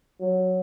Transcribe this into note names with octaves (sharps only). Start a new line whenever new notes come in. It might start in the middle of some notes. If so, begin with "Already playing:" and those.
F#3